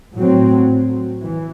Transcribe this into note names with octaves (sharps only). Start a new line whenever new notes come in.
A2 F#3 C4
E3